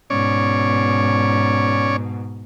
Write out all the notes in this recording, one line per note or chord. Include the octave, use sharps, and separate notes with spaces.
G#2 B2 C#4 C#5 D5